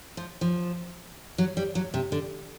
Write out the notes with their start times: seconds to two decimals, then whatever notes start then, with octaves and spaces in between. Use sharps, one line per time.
0.17 F3
0.41 F3
1.38 F#3
1.57 G3
1.75 F#3
1.94 C3
2.12 D3